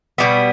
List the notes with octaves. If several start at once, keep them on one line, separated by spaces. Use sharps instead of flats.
B2 G3 B3